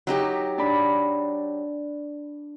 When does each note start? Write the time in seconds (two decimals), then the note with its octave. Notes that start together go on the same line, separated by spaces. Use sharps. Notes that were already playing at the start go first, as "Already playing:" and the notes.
0.07 F#3 D#4 G4
0.58 D4 D5 B5